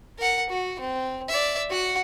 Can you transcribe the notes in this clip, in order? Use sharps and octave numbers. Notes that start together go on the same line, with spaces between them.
A#4 F#5
F#4
C4
D5 E5
F#4 F#5